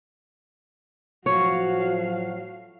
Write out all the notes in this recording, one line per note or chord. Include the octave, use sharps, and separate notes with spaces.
A2 F3 F#3 F#4 C#5 F5